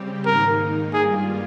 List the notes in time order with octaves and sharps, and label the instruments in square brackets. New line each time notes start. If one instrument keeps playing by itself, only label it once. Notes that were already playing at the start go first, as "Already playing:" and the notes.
Already playing: [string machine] C#3 G3 C4 G4
[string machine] G#2 D#3 A#3 D#4 [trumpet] A#4
[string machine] G2 G3 A#3 F4 [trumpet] G#4